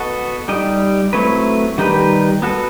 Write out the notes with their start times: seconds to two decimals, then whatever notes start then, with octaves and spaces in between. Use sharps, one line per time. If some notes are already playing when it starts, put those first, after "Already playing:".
Already playing: B3 F#4 A4 D#5
0.48 G3 D#4 G4 D#5
1.13 F#3 A3 C4 E4 B4
1.78 D#3 G3 D#4 G4 B4
2.42 B3 F#4 A4